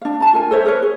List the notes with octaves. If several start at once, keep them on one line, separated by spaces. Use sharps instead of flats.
D4 F5
A5 A#5
F4 A#4 G#5
A4 C5 C#5 E5
G#4 A#4 B4 C#5
G#4